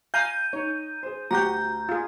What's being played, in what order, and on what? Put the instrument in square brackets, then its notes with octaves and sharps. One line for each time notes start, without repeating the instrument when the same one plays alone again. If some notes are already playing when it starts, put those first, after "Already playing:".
[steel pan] F5 G#5 A#5 [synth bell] G6 D#7
[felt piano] D#4 [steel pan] C#5
[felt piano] G#4 C5
[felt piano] D2 [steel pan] F#4 G4 [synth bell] A#5 G6
[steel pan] F4 G#4